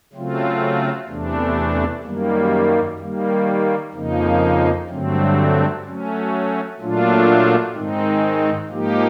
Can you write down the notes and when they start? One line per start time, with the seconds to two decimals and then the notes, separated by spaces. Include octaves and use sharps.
0.13 C#3 F#3 A3 C4 F4
1.08 E2 C3 E3 A3 D4
2.03 F#2 D#3 G3 A#3
2.99 D#3 G3 A#3
3.94 F2 C#3 F3 A#3 D#4
4.89 G2 D3 F#3 A3 C4
5.85 F#3 A3 C#4
6.79 A#2 F#3 A3 D4 F4
7.74 G#2 D#3 G#3 C4 D#4
8.69 G#2 F3 A#3 D#4 G4